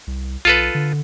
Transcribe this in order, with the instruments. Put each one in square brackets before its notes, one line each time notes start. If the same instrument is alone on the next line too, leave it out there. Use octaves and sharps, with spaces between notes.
[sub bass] C2
[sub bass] B1 [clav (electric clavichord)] F4 A4 B4
[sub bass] D3